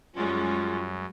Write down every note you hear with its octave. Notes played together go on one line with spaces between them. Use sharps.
F#2 G3 G#3 C#4 F4